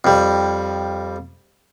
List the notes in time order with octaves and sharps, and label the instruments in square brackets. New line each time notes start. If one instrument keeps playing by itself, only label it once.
[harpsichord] F2 G3